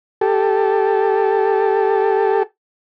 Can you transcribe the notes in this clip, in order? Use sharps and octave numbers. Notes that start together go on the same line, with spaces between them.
G4 A4